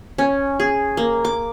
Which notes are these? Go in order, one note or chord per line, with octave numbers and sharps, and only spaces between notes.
C#4
G#4
A#3
D6